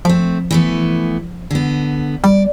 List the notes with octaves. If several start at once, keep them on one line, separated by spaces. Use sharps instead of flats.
F3 A3 C4
E3 A3 B3
D3 B3
G3 D5